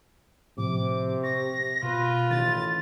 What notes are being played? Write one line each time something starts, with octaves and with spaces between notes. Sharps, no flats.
A2 C3 F3 D6
C#6 A#6
B2 F4 B4
A1 D#3 A6